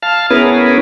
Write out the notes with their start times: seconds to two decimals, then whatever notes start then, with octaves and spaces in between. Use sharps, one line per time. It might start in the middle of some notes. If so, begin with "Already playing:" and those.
0.03 F5 A5 F6
0.30 B3 C#4 E4 G#4 A#4 B4